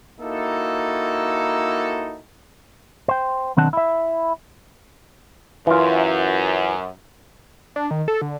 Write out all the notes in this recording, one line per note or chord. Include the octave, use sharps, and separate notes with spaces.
A#3 D#4 E4 F#4 A4
C5 G5
B1 D#3 C4 D4 F#5 A5
E4 E5
F#2 E3 F4
D4
D#3
A4
D3